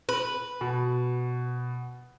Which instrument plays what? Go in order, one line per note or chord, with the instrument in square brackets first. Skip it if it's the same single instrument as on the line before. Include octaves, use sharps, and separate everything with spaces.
[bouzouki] B4
[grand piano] B2